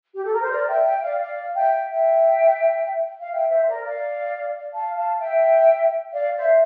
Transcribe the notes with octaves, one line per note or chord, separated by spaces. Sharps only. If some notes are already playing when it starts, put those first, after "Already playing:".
G4
A4
A#4
C5
A#4 D5
E5 G5
E5 G5
D5 F5
D5 F5
E5 G5
E5 G5
F5
E5 G5
C5 E5
A#4 D5
D5 F5
F5 A5
F5 A5
E5 G5
D5 F5
C5 E5